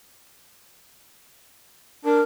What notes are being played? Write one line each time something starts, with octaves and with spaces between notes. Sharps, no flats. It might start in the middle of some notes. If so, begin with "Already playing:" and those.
D4 A#4